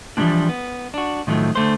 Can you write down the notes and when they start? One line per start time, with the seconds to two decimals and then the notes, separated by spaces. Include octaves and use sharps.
0.17 E3 F3 G3 A#3 C4 D4
0.49 B3
0.94 D4 F#4
1.27 A2 D#3 F3 F#3 A3
1.55 D3 A3 C5